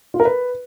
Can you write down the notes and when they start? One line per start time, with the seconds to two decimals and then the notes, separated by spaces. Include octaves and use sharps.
0.14 F4
0.20 A#4
0.25 B4